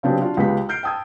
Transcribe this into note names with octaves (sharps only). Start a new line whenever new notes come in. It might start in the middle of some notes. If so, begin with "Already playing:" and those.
C#3 F#3 B3 C4 D4 G4
D4 F4 F#4
C#2 G#3 B3 G4 B6
F6 G6 C7 D7
G5 A5 D#6 E6 G#6